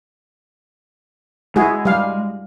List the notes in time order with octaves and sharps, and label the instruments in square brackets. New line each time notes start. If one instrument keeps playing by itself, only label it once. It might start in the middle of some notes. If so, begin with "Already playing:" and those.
[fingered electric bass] G#3 [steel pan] E4 F#4 G#4
[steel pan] G3 F5